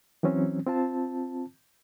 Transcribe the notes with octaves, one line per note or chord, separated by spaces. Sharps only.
E3 F#3 C4 C#4
C4 F4 A5